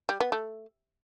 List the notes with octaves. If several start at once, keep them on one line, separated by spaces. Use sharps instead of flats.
G3
B3
A3